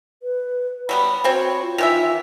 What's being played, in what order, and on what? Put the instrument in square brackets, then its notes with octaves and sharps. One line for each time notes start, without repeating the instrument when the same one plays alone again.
[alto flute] B4
[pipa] F#3 G3 B3 [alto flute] B5
[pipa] C4 C5 C#5 [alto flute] F#4
[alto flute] F4
[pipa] D#3 E3 E5